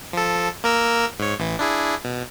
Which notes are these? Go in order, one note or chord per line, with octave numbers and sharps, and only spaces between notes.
F3 A4
A#3 A#4 E6
G#2 C#5
A1 E3
D4 E4 G#4
B2